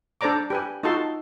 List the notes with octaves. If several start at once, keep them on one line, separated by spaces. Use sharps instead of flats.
D4 A4 C5 D5 A#5 D6
G4 B4 G#5
D#4 F4 F#4 A4 A5 C6